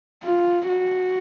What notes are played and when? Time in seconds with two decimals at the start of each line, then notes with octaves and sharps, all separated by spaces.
0.24 F4
0.69 F#4